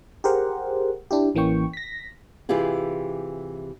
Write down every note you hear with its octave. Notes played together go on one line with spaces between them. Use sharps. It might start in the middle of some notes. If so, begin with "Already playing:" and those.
G4 G#4 A#4 C5 F#5
D4 E4 G4
A1 E3 A#3 C#4 G5 C#6
A#6 B6
C3 E3 E4 F4 G4 G#4